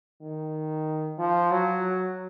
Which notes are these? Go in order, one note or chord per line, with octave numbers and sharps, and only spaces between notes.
D#3
F3
F#3